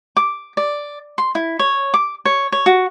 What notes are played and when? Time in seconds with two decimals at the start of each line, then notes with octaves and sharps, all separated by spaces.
0.17 D6
0.57 D5
1.18 C6
1.35 E4
1.59 C#5
1.94 D6
2.25 C#5
2.52 C#5
2.66 F#4